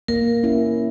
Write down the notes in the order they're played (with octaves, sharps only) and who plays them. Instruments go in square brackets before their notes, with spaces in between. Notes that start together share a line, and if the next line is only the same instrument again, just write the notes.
[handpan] A#3 [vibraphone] A#4
[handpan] C#4 E4